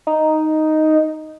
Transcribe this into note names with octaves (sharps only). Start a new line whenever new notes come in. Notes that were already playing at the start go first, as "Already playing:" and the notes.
D#4